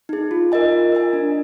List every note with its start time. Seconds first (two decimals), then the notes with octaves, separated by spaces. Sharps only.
0.09 D#4 G#4
0.31 F4
0.52 A#4 D#5 G#5
0.72 F4
0.92 A#4 D#5 G#5
1.13 D4